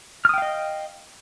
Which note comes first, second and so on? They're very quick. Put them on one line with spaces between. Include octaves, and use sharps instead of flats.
F6 D#6 G5 F5 D#5